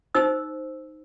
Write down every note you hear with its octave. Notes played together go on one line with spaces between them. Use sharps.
D#4 C5 E6